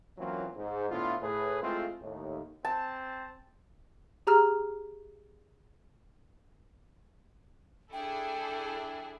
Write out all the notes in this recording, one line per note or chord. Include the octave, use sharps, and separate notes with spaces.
E3 F#3 A#3 C4 C#4 F4
G#2
A2 D3 B3 E4 F4
A2 G#4 B4
G#3 A3 C4 E4 F4
D#2 A2
C4 A5
G4 G#4 A#5 E6 F6
D4 E4 G#4 A4 G5